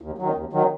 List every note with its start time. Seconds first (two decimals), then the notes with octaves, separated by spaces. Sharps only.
0.01 D#2
0.18 D#3 F#3
0.35 D#2
0.53 D#3 F#3